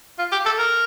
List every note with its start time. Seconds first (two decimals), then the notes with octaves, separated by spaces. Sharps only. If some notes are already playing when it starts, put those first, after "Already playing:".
0.19 F4
0.32 G4
0.46 A4
0.59 A#4